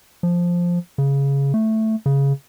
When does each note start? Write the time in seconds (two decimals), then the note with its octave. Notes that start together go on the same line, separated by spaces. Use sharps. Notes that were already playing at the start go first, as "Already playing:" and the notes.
0.23 F3
0.98 C#3
1.54 A3
2.06 C#3